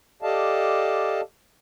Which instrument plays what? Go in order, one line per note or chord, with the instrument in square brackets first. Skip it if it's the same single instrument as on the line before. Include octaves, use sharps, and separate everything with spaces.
[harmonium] G4 A4 D5 D#5 F5 A5